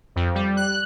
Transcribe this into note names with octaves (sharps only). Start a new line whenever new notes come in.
F2
G3
F#6